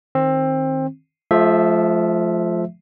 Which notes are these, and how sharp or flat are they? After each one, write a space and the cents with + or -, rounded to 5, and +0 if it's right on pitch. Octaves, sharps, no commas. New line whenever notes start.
D#3 +0 C4 +20
F3 +0 A3 -45 E5 +0